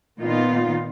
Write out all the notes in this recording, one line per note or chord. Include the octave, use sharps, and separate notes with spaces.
A#2 D#3 B3 D#4 F4